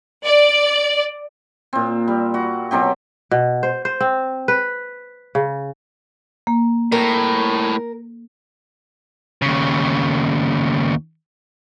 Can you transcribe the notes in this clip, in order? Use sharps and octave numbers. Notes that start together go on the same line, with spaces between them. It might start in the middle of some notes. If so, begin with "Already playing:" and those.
D5
A#2 C4
G3
F#4
B2 F#3 C4 G4
B2
C5
C5
C4
B4
C#3
A#3
C2 A2 A#4
D#2 C#3